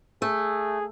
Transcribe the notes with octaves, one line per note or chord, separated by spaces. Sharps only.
A3 G#4